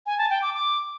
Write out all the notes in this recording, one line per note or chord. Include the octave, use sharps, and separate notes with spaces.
G#5
A5
G5
D6
D6